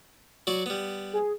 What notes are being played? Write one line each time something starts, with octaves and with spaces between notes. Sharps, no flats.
F#3 F#4 D5
G3 B3
G#4